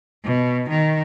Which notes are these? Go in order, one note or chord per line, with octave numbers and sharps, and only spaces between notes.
B2
D#3